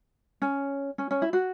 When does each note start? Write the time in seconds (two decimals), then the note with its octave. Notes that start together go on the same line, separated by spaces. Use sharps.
0.42 C#4
0.98 C#4
1.11 C#4
1.22 E4
1.33 F#4